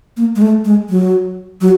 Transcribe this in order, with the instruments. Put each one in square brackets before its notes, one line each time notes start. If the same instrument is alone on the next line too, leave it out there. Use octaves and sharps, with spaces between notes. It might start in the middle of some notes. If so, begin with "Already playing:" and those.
[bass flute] A#3
G#3
A3
G#3
F#3
F#3